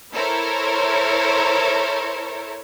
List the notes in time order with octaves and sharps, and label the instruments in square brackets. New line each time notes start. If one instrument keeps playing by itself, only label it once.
[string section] E4 A4 A#4 C5 C#5